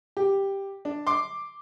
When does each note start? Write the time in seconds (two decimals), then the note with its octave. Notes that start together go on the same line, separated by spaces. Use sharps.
0.17 G4
0.85 D4
1.07 C6 D6